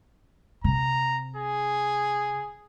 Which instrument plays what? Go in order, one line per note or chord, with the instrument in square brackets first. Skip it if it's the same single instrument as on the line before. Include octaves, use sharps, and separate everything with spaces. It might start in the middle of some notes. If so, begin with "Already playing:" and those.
[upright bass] C3 [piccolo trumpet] A#5
[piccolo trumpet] G#4